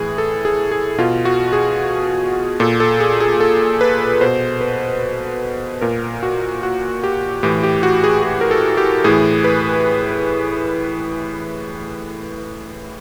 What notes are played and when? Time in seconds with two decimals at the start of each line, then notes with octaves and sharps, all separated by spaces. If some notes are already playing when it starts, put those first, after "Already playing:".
Already playing: A2 E3 G#4
0.18 A4
0.45 G#4
0.72 G#4
0.98 B2 F4
1.25 F#4
1.53 G#4
2.60 A#2 A4
2.80 A4
3.00 G#4
3.20 G#4
3.40 A4
3.81 B4
4.21 B2 C5
4.61 B4
5.81 A#2 A#4
6.23 F#4
6.63 F#4
7.04 G4
7.43 A2 E3 G4
7.63 G4
7.83 F#4
8.04 G#4
8.24 G#4
8.41 A#4
8.51 A4
8.77 G4
9.04 A2 E3 G#4
9.44 B4